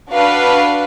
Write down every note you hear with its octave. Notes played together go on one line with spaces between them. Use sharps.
D4 F#4 B4 F5